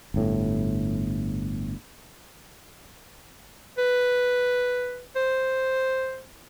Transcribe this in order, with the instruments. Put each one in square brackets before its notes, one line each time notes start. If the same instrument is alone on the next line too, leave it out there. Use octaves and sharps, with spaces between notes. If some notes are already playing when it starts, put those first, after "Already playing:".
[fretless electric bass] G1 A2
[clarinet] B4
C5